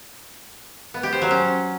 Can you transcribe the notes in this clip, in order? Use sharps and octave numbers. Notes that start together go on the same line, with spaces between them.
B3
G4
C5
F#3
C#4